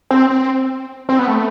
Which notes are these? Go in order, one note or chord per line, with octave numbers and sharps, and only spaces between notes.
C4
C4
C4
B3
A3